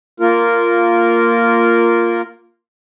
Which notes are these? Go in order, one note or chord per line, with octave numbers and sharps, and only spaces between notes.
A#3 F4 A#4